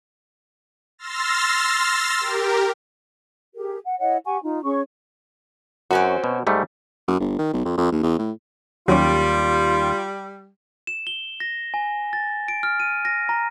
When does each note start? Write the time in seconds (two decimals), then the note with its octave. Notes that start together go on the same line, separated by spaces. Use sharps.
0.98 C6 E6 F6 A6 A#6
2.20 G4 A#4
3.55 G4 G#4 A#4
3.85 F#5
4.00 E4 C#5 D#5 F#5
4.25 G4 F#5 G#5 C#6
4.43 D#4 F4
4.64 C#4 G#4 C#5 C#6
5.91 F#2 C4 C#4 F#4
6.24 B2
6.47 G#2 G3 A3
7.08 F#2
7.20 G1
7.38 D#3
7.53 B1
7.65 F2
7.77 F2
7.92 D#2
8.03 E2
8.19 A2
8.88 D#2 F#3 G3 C#4 F4
10.87 E7
11.07 G7
11.40 A#6
11.74 G#5
12.13 A6
12.48 D7
12.63 F6
12.80 D#7
13.05 A#6
13.29 A#5